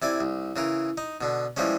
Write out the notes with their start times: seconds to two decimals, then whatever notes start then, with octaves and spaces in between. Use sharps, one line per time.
0.02 C3 E4 D5 G#5
0.21 C2
0.56 C#3 E3 A#4
0.98 D#4
1.21 B2 D3
1.57 E3 F3 G3 G#3 C#4